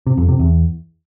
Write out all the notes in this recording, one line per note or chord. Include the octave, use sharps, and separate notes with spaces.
C3
F2
C3
E2